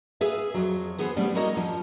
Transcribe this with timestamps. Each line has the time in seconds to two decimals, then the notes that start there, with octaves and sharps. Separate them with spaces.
0.21 G#4 B4 E5 F5
0.54 F2 F#3
0.98 E3 B3 G#4 C5
1.16 F3 G3 A3 B3 C#4
1.35 A3 A#3 E4 F#4 C#5 D#5
1.54 F#2 F3